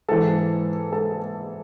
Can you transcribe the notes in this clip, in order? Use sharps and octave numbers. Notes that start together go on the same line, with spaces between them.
G#2 E3 A4 A5
A4 A5